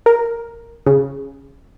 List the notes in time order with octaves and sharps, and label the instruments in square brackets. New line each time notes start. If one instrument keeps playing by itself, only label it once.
[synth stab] A#4
C#3